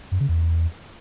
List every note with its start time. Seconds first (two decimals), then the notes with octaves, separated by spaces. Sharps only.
0.12 F#2
0.20 C#3
0.29 E2